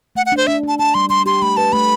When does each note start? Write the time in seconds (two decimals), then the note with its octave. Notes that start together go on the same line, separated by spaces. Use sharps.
0.15 A3 F#5
0.26 F#5
0.32 D4
0.37 C5
0.47 D4 E5
0.63 D4 A5
0.79 D4 A5
0.94 G3 C6
1.10 G3 C6
1.26 G4 C6
1.42 A3 B5
1.57 B4 A5
1.73 A3 B5